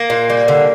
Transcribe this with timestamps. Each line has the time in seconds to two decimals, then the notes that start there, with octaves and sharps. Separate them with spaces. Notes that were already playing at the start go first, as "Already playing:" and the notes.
Already playing: A#3
0.10 A#2
0.30 G3
0.48 D3